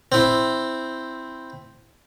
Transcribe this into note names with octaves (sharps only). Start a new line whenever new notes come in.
C4 E4